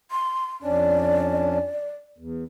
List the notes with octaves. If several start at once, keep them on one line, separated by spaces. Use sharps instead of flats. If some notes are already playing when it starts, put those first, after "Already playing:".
C6
F2 C#4 D4 D5
E2